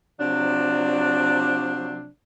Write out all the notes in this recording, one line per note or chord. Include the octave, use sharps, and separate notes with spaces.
C3 F3 F#3 D4